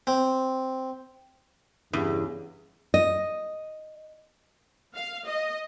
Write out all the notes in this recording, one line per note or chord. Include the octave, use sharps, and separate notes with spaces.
C4
E2 G2 C#3
D#5
F5
D#5